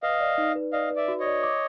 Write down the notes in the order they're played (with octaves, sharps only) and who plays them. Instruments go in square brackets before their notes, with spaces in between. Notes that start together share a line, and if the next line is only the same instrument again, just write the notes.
[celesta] B4 [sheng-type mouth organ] D#5 F5
[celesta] D5
D#4
B4
[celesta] D5 [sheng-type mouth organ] D#5 F5
[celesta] B4
[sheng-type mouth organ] D5 E5
[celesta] F#4
[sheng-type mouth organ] C#5 D#5
[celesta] D5
D6